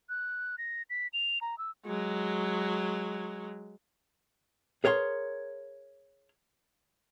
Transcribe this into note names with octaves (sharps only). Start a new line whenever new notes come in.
F#6
A#6
B6
F7
A#5
E6
F#3 G#3
G#4 A#4 C#5 F5 C6